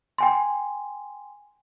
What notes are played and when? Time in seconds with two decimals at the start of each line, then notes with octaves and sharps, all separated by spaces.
0.18 G5 G#5 C6